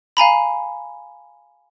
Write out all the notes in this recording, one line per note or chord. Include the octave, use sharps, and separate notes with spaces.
F5 G#5 A#5 B5